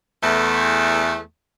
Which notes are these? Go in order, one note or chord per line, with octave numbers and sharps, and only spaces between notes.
E2 A3